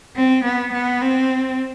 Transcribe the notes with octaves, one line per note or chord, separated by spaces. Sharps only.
C4
B3
B3
C4